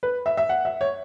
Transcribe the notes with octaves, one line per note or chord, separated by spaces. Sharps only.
B4
E5
E5
F#5
E5
C#5